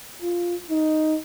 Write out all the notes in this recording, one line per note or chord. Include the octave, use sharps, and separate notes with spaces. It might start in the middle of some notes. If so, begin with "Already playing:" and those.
F4
D#4